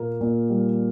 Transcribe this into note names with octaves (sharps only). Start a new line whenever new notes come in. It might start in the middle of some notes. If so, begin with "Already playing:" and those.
Already playing: A#2 A#3
A#2
G3